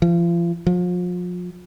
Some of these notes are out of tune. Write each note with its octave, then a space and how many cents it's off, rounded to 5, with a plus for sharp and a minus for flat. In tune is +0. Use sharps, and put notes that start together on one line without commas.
F3 -35
F3 +35